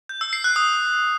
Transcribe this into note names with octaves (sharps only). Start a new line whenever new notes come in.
G6
E6
C7
F#6
D#6